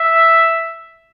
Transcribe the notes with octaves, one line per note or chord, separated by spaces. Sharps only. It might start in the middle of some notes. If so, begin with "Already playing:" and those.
Already playing: E5